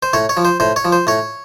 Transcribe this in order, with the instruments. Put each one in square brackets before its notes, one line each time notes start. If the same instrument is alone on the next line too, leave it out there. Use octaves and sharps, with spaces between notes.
[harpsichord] C5
A2 C#5
C#5
F3
C5
A2 C5
C#5
F3
C5
A2 C#5